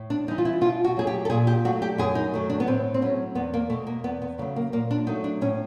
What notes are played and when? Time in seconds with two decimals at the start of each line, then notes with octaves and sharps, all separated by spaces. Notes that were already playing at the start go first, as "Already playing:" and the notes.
Already playing: A2
0.10 D4
0.27 G3 D#4
0.31 E3
0.38 F4
0.45 E4
0.61 B2 F4
0.84 F#4
0.97 F#3 A3 G#4
1.07 G4
1.25 A4
1.30 A#2 G#4
1.47 G4
1.65 F#3 A3 F#4
1.82 G4
1.98 F#2 G#4
2.15 D#4
2.34 D#3 F#3 A3
2.50 D4
2.60 B3
2.67 A2 C4
2.94 C4
3.02 F#3 A3 C#4
3.35 E2 B3
3.54 A#3
3.70 B2 G#3 A3
3.87 A#3
4.04 E2 B3
4.22 B3
4.38 C#3 F#3 A3 A#3
4.56 A#3
4.72 A#2 A#3
4.91 D4
5.07 F#3 A3 D#4
5.24 D4
5.41 A2 C#4